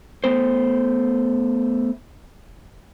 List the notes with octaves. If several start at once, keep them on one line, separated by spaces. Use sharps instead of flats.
A3 B3 C5